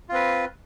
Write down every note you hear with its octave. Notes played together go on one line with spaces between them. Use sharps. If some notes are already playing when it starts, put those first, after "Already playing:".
C4 F4 B4